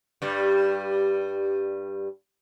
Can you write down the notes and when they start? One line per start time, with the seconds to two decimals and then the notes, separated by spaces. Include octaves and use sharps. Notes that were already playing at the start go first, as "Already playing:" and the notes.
0.22 G2 G3